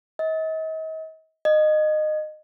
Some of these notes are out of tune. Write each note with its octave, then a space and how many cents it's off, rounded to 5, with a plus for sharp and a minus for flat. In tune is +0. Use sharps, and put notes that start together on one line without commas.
D#5 +40
D#5 -20